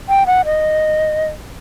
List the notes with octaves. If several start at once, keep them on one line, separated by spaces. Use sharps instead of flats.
G5
F#5
D#5